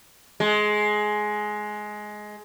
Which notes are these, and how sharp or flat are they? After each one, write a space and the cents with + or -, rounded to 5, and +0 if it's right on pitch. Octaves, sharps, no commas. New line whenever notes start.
G#3 +15